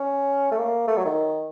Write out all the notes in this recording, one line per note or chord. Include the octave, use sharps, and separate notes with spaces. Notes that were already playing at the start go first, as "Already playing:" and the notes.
Already playing: C#4
A3
A#3
A3
F#3
D#3